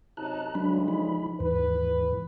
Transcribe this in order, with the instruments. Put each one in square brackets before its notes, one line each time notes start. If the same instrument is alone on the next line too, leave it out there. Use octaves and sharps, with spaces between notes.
[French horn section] F#2 C3 D#4 [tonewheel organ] A5 A#5 F#6
[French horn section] D2 C#3 G#3 [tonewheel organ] F#3 D4 B5
[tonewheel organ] F3 D#4 B5
[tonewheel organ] D#2 G#2 E3 [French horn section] B4